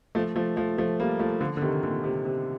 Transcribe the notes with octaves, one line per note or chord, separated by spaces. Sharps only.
F3 A3
F3 A3
F3 A3
F3 A3
G3 A#3
F3 A3
D3 F3
D3
C3 D#3
A#2 D3
C3
C3